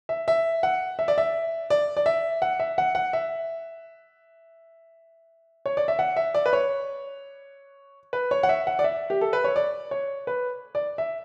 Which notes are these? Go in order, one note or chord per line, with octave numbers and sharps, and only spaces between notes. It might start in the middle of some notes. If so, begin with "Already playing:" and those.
E5
E5
F#5
E5
D5
E5
D5
D5
E5
F#5
E5
F#5
F#5
E5
C#5
D5
E5
F#5
E5
D5
B4
C#5
B4
C#5
F#5
E5
F#5
D5
E5
G4
A4
B4
C#5
D5
C#5
B4
D5
E5